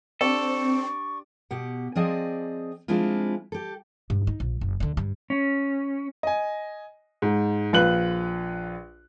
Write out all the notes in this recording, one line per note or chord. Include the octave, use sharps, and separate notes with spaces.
C4 D4 G4 A4 D5 C#6
B2 G4 F#5
F3 C4 G#4 D5 D#5
F3 G#3 C4 D4 E4 F4
G4 A4
G2
D#4
A#1
F#1
D2 D3
G2
C#4
D#5 G#5
G#2
A#1 F4 B4 F#6 F#7